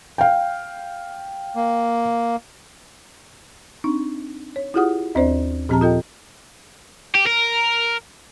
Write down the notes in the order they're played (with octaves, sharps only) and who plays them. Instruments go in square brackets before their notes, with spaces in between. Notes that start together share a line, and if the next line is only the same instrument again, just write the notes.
[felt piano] F5 G5
[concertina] A#3
[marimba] C4 D4 D#4
C#5
E4 F4 G4 G#4 F#5 D#6
D#2 C4 D4 C5 D5
A#2 F3 C4 G4 A5 A#5
F4 A4 D#5 G5
[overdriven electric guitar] G4
A#4